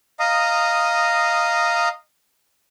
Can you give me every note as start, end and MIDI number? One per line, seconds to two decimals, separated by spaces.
0.19 1.89 75
0.19 1.89 77
0.19 1.89 82
0.19 1.89 87